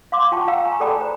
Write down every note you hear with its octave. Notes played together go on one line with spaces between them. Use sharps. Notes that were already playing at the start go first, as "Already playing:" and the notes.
F5 C6 D6
F4 G5 A5 C#6
F5 G5 A#5 E6
G#5 A#5 C#6
G#4 A4 D5 G5 A5 B5
C5 A#5